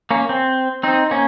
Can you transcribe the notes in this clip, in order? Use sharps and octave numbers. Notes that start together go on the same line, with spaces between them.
A#3 C#4
C4
C4 D#4
A#3 C#4